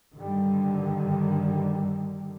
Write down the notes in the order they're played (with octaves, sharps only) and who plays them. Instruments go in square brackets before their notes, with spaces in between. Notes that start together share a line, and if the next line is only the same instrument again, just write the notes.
[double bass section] G2 D3 D#3 G3